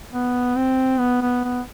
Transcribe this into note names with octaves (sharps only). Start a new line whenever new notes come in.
B3
C4
B3
B3
B3